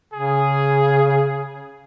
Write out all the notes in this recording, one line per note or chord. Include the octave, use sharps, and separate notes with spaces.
C#3 G#4